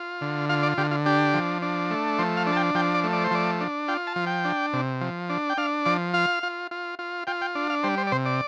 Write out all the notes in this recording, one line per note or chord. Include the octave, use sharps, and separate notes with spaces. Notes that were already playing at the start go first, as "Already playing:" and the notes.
Already playing: F4
D3
F4 F5
D5
D3 G4
F4
D4 G4
F3
D4
A3
F3 C5
F5
D4
A5
G5
F3 G5
D5
A3
D5
C5
F3 D5
D4
F4 G5
A5
F3
G5
D4
C3
F3
D4
G5
D4 F5
F3 D5
F4 F5
F4
F4
F4
F4 G5
G5
D4
F5
G3 C5
C5
D5
C3 C5
D5